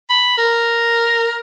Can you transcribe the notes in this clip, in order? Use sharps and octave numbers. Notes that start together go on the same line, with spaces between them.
B5
A#4